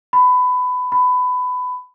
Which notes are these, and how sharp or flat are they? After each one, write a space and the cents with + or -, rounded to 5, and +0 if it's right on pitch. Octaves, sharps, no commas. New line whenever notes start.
B5 +20
B5 +20